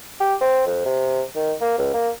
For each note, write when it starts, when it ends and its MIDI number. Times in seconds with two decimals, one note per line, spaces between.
0.20 0.35 67
0.41 0.62 60
0.66 0.81 41
0.85 1.21 48
1.36 1.53 51
1.61 1.77 58
1.78 1.89 37
1.94 2.10 58